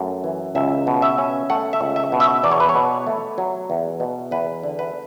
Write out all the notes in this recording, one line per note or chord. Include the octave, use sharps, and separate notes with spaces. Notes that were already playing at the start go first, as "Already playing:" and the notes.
Already playing: F#2 A3
E3
C#2 E5
B2
E5
C#4
A3 F#5
E5
C#2
E5
B2
E5
E2 D5
C#5
B4
C#5
B2
A3
F#3
E2
B2
E2 B4
D3
B4